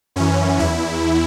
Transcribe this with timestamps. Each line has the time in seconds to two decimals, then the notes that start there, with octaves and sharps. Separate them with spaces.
0.16 F#2 E3 C#4
0.59 E2 E4